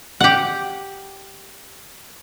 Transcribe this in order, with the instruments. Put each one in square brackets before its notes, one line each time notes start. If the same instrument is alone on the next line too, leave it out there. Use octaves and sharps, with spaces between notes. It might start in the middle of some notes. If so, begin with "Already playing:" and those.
[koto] G4 F#5